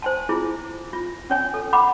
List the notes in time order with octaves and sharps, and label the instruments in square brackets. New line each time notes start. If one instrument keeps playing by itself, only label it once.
[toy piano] C5 G#5 A5
E4 F4 G#4
F4
C#4 C#5 G#5
A4
F#5 A#5 B5 D6